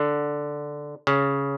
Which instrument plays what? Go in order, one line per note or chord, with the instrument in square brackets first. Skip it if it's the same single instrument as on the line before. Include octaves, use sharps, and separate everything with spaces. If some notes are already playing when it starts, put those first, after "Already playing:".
Already playing: [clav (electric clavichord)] D3
C#3